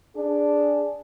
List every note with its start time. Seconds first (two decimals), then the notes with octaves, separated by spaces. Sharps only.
0.15 D4 G#4